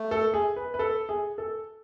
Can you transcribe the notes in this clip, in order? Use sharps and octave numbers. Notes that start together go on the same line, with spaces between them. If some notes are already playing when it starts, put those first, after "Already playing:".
Already playing: A3
A4
G#4
B4
B4
A4
G#4
A4